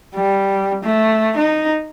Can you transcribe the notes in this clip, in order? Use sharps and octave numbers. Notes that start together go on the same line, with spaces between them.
G3
A3
D#4